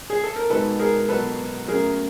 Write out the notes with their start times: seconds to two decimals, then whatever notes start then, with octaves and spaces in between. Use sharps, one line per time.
0.10 G#4
0.24 A4
0.36 A#4
0.50 B2 G#3 B3 D#4 F#4 A4 B4
0.79 G#4 A#4
1.09 B2 F#3 B3 A4 B4
1.68 F#3 A3 C#4 G#4 A#4